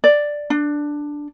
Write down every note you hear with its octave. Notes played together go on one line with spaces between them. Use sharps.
D5
D4